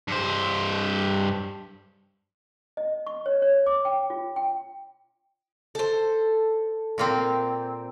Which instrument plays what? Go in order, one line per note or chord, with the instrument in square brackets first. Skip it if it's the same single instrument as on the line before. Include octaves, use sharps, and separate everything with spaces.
[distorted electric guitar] G2 C5
[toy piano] D#5
C#6
C#5
C#5
D6
G5
F4
G5
[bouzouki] A4 C5
[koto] A#2 A#3 C4